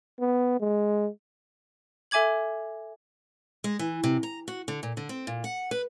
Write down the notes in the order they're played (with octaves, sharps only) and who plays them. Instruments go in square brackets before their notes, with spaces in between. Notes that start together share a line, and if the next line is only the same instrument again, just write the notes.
[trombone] B3
G#3
[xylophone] A4 E5 G#5 D6 G#6 F#7
[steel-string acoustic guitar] G#3
E3
C3
A#5
F#4
D3
A#2
D3
C4
A#2
F#5
B4